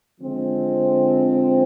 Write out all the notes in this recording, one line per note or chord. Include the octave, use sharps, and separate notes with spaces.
D3 F3 G#3 C4